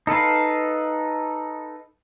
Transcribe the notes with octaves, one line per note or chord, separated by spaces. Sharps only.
D#4 A4 B4 F5